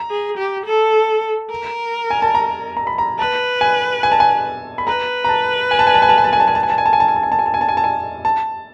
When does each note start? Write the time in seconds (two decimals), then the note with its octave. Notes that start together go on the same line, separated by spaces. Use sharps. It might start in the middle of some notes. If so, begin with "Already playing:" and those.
Already playing: A#5
0.10 G#4
0.38 G4
0.66 A4
1.50 A#4
2.10 G#5
2.22 A5
2.35 A#5
2.77 A#5
2.87 B5
2.98 A#5
3.19 B4 A5
3.61 G#5
4.03 G#5
4.12 A5
4.20 G#5
4.78 B5
4.87 B4 A#5
5.25 A#5
5.29 A5
5.71 G#5
5.79 A5
5.87 G#5
5.94 A5
6.02 G#5
6.09 A5
6.18 G#5
6.24 A5
6.33 G#5
6.40 A5
6.48 G#5
6.55 A5
6.63 G#5
6.70 A5
6.78 G#5
6.86 A5
6.93 G#5
7.00 A5
7.08 G#5
7.16 A5
7.23 G#5
7.32 A5
7.39 G#5
7.46 A5
7.54 G#5
7.61 A5
7.69 G#5
7.77 A5
7.84 G#5
8.25 A5